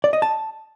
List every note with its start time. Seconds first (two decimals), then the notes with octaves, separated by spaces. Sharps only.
0.04 D5
0.13 D#5
0.22 A5